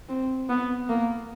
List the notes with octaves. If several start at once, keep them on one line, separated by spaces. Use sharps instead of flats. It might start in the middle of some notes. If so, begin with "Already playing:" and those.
C4
B3
A#3